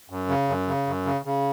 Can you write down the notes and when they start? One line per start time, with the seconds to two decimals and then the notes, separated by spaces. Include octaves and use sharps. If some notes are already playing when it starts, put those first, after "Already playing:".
0.10 F#2
0.29 C#3
0.48 F#2
0.67 C#3
0.87 F#2
1.06 C#3
1.25 C#3